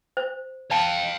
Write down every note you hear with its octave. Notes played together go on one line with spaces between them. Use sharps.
C5
F5 G5 A5